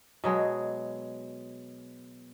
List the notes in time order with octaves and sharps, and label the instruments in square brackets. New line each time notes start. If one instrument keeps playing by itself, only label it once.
[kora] B2 F#3 G#3